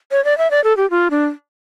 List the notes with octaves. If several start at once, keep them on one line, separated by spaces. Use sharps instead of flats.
C#5
D5
E5
D5
A4
G4
F4
D4